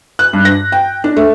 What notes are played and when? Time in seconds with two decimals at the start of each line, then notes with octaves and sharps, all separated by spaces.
0.19 F#6
0.33 G2
0.45 A#6
0.72 G5
1.04 D4
1.17 A3